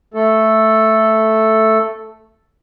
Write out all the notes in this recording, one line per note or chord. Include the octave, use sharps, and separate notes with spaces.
A3 A4